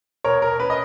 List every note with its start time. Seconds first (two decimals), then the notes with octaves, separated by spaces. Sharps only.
0.24 B2 A#4 C#5
0.42 A#4
0.59 C#4 B4
0.70 D#5